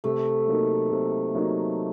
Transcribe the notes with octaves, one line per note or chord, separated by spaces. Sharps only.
C3 A3
F#3 A#3 D#4
C3
F#3 A#3 D#4